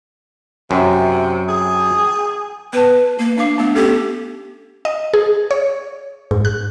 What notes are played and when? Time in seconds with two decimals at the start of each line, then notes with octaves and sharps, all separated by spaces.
0.71 F#2 C3
1.49 G#4
2.73 B3 B4 A5
3.18 A#3
3.38 D4 F5 D6
3.58 A3 B3 D4
3.75 B3 C#4 G4 A4
4.85 D#5
5.14 G#4
5.51 C#5
6.31 G#2
6.45 F#6